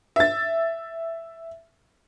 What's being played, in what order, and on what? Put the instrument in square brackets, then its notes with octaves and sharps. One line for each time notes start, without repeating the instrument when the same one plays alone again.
[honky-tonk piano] E5 A6